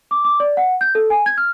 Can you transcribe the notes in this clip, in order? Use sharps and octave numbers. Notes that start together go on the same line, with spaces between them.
D6
D6
D5
F#5
G6
A4
G#5
G#6
F6